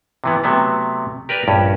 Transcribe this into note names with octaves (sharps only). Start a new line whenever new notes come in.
C3 E3 B3
C3 F#3 A3 B3
G4 A#4 B4 D5
A#1 G2 C#4